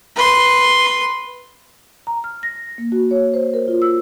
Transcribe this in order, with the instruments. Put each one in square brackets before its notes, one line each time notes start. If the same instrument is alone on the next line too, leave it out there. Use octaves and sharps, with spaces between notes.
[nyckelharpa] B4 C6
[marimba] A#5
F6
A#6
A#3
F#4
C#5
C5
A#4
F4
E6